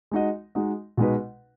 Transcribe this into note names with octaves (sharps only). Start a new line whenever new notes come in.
G#3 D#4 F#4 D#5
G#3 D#4 F#4 D#5
B2 G#3 D#4 F#4 B4